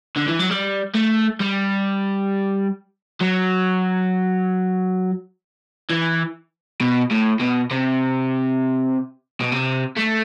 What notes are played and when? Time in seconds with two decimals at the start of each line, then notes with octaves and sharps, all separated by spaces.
0.16 D3
0.27 E3
0.39 F#3
0.50 G3
0.95 A3
1.40 G3
3.21 F#3
5.90 E3
6.81 B2
7.11 A2
7.41 B2
7.71 C3
9.41 B2
9.52 C3
9.96 A3